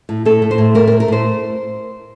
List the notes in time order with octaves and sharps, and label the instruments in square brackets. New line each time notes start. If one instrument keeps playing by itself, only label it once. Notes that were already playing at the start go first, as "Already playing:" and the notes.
[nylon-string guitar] A2
A2 A4
A2
C5
A2
A3 A#4
A#4
A3
A#4
A2 C5